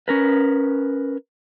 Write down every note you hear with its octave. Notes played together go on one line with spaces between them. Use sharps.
C#4 A#4 B4